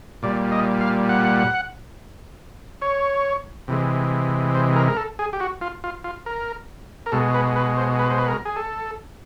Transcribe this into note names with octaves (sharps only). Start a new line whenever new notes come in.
A#2 G3 D5
D#5
F5
F#5
C#5
C3 E3 G#3
C5
A#4
A#4
A4
G#4
G4
F#4
F4
F4
F4
A#4
A#4
B2 G#3 A4
B4
B4
C5
B4
C5
B4
A#4
G#4
A4